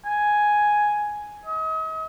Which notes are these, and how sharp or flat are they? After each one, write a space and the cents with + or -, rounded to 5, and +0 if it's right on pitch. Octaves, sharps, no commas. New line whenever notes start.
G#5 +5
D#5 +40